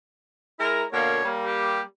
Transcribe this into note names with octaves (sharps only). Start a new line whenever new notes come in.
G#3 E4 A#4
B2 D3 A#3 C#5
G3 A#3
G4